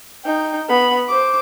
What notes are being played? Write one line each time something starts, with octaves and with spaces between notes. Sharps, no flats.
D#4 G5
B3 B5
C5 D6